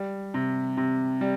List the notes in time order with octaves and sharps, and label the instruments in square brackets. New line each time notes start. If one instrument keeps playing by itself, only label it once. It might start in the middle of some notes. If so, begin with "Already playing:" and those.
Already playing: [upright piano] G3
C3
C3
G3